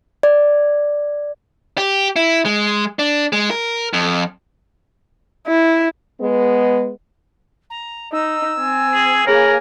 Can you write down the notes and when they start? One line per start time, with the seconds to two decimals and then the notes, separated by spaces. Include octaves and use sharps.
0.23 D5
1.78 G4
2.16 E4
2.45 G#3
2.99 D4
3.33 G#3
3.50 A#4
3.93 F2
5.47 E4
6.19 G#3 B3
7.70 A#5
8.13 D#4 E6
8.58 C4 G#5
8.94 G#4
9.27 A#3 G#4 A#4 C#5 G#5 B5